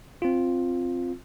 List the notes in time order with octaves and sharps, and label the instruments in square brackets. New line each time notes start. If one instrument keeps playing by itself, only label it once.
[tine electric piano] C4 F4